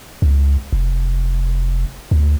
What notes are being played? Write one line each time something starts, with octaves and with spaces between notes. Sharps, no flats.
C#2
F1
D2